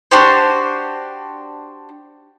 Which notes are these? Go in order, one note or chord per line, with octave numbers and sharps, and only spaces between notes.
D4 F#4 G4 C5